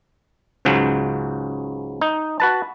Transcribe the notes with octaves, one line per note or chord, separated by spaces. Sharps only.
C#2 G#2 C#3 F#3
D#4
F#4 B4 A5